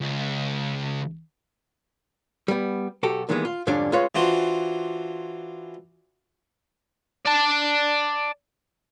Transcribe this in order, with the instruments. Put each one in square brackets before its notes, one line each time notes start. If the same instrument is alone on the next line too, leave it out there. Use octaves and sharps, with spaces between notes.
[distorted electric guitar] C#2
[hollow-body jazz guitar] G3 B3
B1 F#4 G4 A4
A#2 D#3 E3 G3 G#3 B3
F4
F2 G#2 D3 G3 C#4 D4
G#3 C#4 F4 B4 C#5
[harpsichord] E3 D4 F4 F#4 C5
[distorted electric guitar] D5 A5